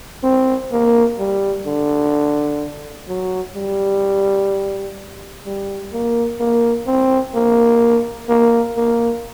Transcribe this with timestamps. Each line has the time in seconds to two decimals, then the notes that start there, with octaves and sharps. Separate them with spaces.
0.24 C4
0.72 A#3
1.19 G3
1.67 D3
3.08 F#3
3.55 G3
5.45 G3
5.93 A#3
6.40 A#3
6.87 C4
7.35 A#3
8.29 A#3
8.77 A#3